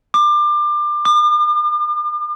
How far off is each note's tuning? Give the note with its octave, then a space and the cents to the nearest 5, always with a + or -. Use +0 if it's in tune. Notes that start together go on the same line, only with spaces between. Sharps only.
D6 +25
D6 +45